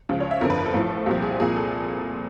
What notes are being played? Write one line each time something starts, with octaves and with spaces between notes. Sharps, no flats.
C#2 C#3 F3
C#5
E5
G1 F2 D3 F3 A#4
B4
A#4
A4
A1 A2 F3
C2 A#2 F3 G4
G#4
C2 A#2 F3 G#4
A4